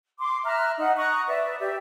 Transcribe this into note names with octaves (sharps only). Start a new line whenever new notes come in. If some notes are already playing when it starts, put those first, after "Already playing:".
C6 D6
E5 A#5 F6 F#6
D#4 F#5
A#5 C#6 D#6 F#6
B4 D5 E5
G4 D5 E5